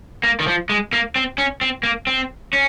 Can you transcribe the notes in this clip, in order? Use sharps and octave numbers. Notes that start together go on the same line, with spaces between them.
A#3
D#3
F3
G#3
A#3
C4
C#4
C4
A#3
C4
C#4